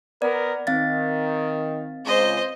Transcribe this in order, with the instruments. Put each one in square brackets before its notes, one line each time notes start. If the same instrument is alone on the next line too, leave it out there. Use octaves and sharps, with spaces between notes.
[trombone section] B3 A#4 [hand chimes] D5
[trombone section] D#3 [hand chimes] C4 F5 A6
[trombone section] C#2 [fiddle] C5 D#5